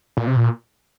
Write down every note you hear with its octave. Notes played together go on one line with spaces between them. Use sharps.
A#2
C3
A#2